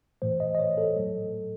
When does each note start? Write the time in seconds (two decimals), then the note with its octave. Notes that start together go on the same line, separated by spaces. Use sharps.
0.22 A2 E3 A3 C5
0.40 D#5
0.55 D#5
0.59 C#5
0.78 A4
0.96 A2 F#3 A3